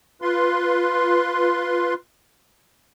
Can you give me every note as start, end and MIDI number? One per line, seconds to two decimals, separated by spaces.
0.22 1.94 65
0.22 1.94 71
0.22 1.94 84